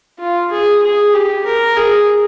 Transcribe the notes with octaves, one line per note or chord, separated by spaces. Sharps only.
F4
G#4
G#4
G4
A#4
G#4